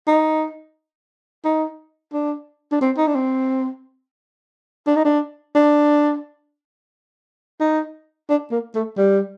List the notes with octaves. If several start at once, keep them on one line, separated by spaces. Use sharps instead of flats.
D#4
D#4
D4
D4
C4
D#4
D4
C4
D4
D#4
D4
D4
D#4
D4
A#3
A3
G3